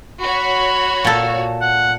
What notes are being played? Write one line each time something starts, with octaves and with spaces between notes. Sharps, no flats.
F#4 C#5 B5
A#2 A4
F#5